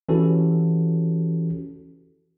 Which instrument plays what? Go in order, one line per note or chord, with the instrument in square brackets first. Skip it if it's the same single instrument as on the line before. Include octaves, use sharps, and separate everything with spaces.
[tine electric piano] E3 C#4 F#4 G4 A4